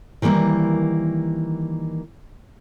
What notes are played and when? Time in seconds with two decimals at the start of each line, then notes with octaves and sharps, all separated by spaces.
0.22 D#3 E3 G3 A#3 E4